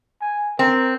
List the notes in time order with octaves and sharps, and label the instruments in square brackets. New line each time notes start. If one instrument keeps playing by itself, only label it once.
[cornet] G#5
[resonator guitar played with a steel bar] C4 [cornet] A#4